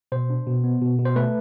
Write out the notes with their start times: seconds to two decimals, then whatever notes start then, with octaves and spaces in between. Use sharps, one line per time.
0.12 B2 C5
0.30 D4
0.47 B2
0.64 B3
0.81 B2
0.98 B2
1.05 C5
1.16 A3 B4